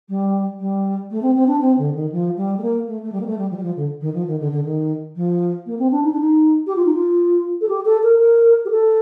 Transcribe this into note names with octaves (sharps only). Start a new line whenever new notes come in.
G3
G3
A3
C4
C4
D4
C4
D3
D#3
F3
G3
A3
A#3
A3
A3
G3
A#3
A3
G3
F3
G3
F3
D3
D#3
F3
D#3
D3
D3
D#3
F3
A#3
C4
D4
D#4
D4
D#4
G4
F4
D#4
F4
A4
G4
A4
A#4
A#4
G4
A4